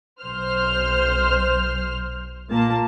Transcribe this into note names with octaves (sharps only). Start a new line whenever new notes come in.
B1 C5 F6
A#2 A#3 A5